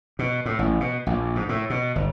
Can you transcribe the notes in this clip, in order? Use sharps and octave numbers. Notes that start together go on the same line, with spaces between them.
B2
A2
A1
B2
A#1
G#2
A2
B2
G1